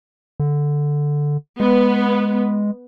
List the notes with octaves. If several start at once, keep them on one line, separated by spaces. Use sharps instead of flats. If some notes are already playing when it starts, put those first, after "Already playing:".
D3
G#3 B3